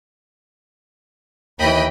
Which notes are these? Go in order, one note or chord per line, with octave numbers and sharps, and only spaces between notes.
D#2 E3 D#5 G5 B5